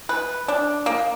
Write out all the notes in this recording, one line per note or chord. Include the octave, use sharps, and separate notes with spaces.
B4
D4
A#3